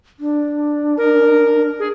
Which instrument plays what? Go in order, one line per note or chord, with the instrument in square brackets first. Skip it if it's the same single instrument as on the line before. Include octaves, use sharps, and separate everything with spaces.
[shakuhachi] D4
[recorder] A#4
G#4